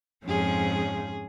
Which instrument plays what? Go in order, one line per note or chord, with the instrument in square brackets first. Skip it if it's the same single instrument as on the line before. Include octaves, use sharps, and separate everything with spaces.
[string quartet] F2 G#2 F3 [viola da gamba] C#4 G#4